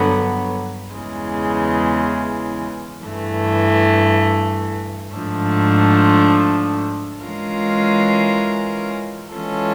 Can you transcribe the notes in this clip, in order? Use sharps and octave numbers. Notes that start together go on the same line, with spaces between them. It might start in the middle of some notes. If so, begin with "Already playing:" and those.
Already playing: G2 D3 F#3 B3
E2 C#3 E3 G#3
G2 E3 A3
G#2 F3 A3 D4
E3 G#3 C#4 F4 A#4
E3 G#3 C#4 F4 A4